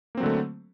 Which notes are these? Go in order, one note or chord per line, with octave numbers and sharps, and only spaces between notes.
D3 F#3 A3 A#3 C4